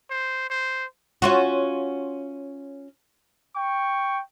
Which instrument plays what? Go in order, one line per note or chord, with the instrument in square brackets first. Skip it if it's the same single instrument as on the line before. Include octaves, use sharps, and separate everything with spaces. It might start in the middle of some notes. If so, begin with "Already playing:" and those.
[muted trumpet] C5
C5
[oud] C#4 F4 F#4
[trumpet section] G5 C#6